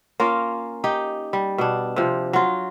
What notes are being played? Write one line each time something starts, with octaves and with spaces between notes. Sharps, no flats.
A#3 C#4 F4 A#4
D#4 G4
G3
B2 D4
C3 F3
F#3 F4